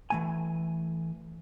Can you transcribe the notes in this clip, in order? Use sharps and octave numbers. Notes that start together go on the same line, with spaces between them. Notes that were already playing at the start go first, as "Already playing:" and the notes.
E3 A3 G#5